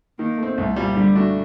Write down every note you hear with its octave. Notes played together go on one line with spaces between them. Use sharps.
D#3 A#3
A3 C4
C2 A3
A#2 G3
D3 G3
A3 D4 F#4